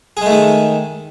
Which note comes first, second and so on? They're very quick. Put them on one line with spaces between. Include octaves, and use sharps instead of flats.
G#4 G#3 A3 D#3